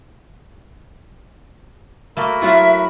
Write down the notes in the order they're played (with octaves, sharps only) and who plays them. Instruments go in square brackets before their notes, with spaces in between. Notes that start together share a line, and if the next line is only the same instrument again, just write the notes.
[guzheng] A3 A#3 [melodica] F#4 A#4 B5
[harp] F#3 E4 [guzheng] F4 F#5 A5 [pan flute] E5